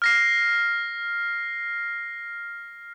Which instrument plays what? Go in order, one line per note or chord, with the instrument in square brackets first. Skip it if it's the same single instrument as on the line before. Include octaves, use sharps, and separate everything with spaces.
[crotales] F6 A#6 C7